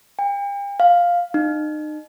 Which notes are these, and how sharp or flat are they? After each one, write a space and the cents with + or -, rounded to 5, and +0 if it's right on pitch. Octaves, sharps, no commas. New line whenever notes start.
G5 +40
F5 +5
D#4 -35